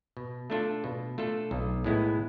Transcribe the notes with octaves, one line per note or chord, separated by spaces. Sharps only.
B2
A3 D4 F4 A4
B2
A3 D4 F4 A4
B1
A2 G#3 B3 E4